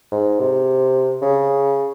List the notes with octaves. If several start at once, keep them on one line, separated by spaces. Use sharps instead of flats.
G#2
C3
C#3